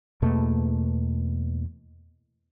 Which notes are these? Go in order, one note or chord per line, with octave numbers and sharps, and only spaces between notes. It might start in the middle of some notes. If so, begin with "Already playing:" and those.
E2 B2 A3 A#3